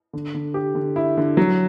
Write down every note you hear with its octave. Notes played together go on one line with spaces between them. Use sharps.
D3
D3
G4
D3
E4
D3
F#3